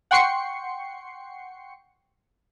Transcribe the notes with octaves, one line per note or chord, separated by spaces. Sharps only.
F#5 G5 C6 C#6 C7 C#7